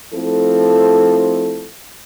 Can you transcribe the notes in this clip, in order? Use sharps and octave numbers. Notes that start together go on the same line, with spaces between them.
F3 A3 C4 E4 A4